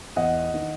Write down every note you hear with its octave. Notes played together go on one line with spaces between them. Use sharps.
E2 D#5 F#5
D#3